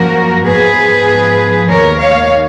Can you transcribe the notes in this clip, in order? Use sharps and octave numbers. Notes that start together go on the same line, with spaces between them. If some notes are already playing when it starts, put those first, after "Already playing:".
Already playing: F#2 F3 A#3 F#4 A#4
G#2 F3 B3 G#4 B4
D#2 D#3 A#3 A#4 C#5
C#5 F5